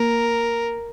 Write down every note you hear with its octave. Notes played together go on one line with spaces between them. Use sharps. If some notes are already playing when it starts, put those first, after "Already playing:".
Already playing: A#3 A#4